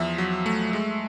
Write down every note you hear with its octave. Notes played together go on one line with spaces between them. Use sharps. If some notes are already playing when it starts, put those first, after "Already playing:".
Already playing: E2 F3 E5
F#3
A3
G#3